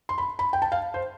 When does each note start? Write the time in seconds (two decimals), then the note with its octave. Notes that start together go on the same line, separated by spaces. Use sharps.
0.09 C6
0.18 B5
0.39 B5
0.53 G5
0.62 A5
0.72 F5
0.94 C5